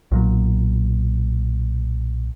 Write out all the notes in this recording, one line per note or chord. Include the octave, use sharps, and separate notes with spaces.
B1 A#2 F#3